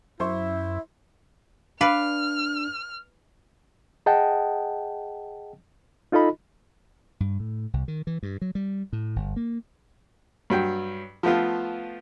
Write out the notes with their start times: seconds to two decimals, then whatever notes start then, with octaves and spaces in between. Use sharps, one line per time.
0.20 F#2 E4 C5 E5 C6 C#6
1.81 D4 B4 D5 F5 F6
4.06 G#4 D#5 F#5 G5 A5
6.12 D#4 F4 A4 D#5 B5
7.20 G2
7.40 A2
7.73 C2
7.88 D#3
8.07 E3
8.23 G2
8.42 F#3
8.55 G3
8.93 A2
9.16 G1
9.36 A#3
10.50 G2 F#3 G5
11.23 F3 A3 B3 F4